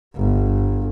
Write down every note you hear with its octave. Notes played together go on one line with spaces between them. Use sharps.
G1